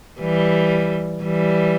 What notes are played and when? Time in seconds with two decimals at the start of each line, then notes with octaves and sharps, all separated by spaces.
0.21 E3 G3
1.23 E3 G3